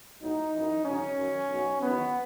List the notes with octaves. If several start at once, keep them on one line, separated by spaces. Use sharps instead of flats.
B1 A2 F#3 D#4
F#2 E3
G#1 F#2 C#3 F#3 C#4
F#2 D#3 F#3
B1 B2 F#3
E2 D#3 F#3 B3